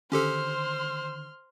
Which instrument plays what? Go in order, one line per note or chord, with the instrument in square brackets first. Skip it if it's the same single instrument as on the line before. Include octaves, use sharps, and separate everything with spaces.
[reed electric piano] D3 D#3 [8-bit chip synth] C#4 G4 A4 [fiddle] C5 [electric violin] C6 F6